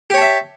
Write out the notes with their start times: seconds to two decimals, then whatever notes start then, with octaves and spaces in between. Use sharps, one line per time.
0.10 G4
0.14 C#5
0.18 A5
0.21 E5